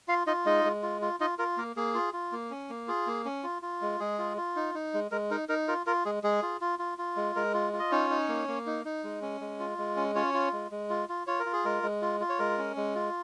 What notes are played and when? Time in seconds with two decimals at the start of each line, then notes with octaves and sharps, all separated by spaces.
0.08 F4 F5
0.27 D#4 F4 D#5
0.46 G#3 D#4 D#5
0.65 G#3
0.83 F4
1.02 F4
1.20 D#4 F4 D#5
1.39 F4 A#4
1.57 A#3 A#4
1.76 A#3 G#4
1.95 F4
2.13 F4
2.32 A#3
2.51 C#4
2.69 A#3
2.88 F4 G#4
3.07 A#3
3.25 C#4
3.43 F4
3.62 F4
3.81 G#3
4.00 G#3 G#4
4.19 F4
4.37 F4
4.56 D#4
4.75 D#4
4.94 G#3
5.11 G#3 A#4
5.31 D#4 A#4
5.49 D#4 A#4
5.68 F4 A#4
5.86 F4 A#4
6.05 G#3 G#4
6.23 G#3 G#4
6.42 F4
6.61 F4
6.79 F4
6.98 F4
7.16 G#3
7.36 G#3 A#4
7.54 F4
7.73 F4
7.79 D#5
7.91 C#4 D#4 C#5
8.10 D#4
8.29 A#3
8.48 A#3
8.66 D#4
8.85 D#4
9.04 G#3
9.22 C#4
9.41 G#3
9.59 F4
9.78 G#3
9.97 C#4
10.15 C#4 F4 C#5
10.34 F4
10.53 G#3
10.71 G#3
10.90 F4
11.09 F4
11.27 F4 C#5
11.39 A#4
11.46 F4
11.53 G#4
11.64 G#3 A#4
11.83 G#3
12.02 F4
12.20 F4
12.29 C#5
12.39 G#3 A#4
12.58 C#4
12.76 G#3
12.95 F4